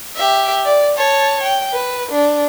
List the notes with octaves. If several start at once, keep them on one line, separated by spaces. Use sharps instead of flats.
G4 E5
D5
C#5 A5
G5
B4
D4